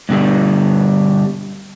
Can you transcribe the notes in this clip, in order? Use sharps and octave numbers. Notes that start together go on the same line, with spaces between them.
G2 B2 D3 G3